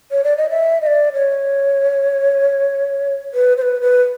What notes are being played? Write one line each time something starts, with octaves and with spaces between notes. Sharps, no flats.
C#5
D5
D#5
E5
D#5
D5
C#5
B4
C5
B4
B4